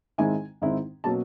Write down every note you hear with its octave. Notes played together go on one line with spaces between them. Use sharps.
G#2 D#3 G#3 C4 E4 G#5
G#2 D#3 G#3 C4 E4
B2 F#3 A#3 C#4 A5